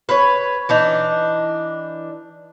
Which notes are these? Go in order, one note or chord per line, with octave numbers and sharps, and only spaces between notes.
B4 C#5
E3 D4 D#4